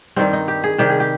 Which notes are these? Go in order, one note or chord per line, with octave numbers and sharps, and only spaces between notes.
G2 D#3 G3 C4
D#4
G4
G#4
C3 D#3 G3 G4
G#4
G4